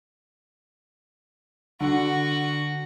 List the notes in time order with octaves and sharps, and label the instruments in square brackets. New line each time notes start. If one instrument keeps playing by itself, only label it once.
[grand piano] D3 [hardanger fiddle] F#4